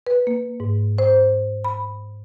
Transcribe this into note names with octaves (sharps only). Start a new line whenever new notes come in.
B4
A#3
G#2
C5
B5